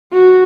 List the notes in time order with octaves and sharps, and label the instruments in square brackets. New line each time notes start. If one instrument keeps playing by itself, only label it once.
[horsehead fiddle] F#4